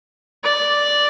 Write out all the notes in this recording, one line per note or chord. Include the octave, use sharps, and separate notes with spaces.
D5